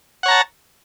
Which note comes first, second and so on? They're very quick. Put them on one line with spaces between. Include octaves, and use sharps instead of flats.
F#5 C#5 A#5 A5